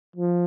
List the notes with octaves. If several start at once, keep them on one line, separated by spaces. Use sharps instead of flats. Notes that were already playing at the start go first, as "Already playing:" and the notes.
F3